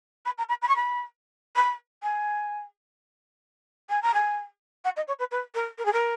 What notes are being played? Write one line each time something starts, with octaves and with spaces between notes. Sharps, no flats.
B5
A#5
B5
B5
C#6
B5
B5
G#5
G#5
A#5
G#5
F#5
D#5
C#5
B4
B4
A#4
A#4
G#4
A#4